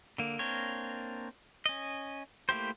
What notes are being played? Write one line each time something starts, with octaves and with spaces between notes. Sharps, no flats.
D3 A#3
A#3 C4 D4 A#4 C#5
C#4 D#5
A3 A#3 E4 G4 C5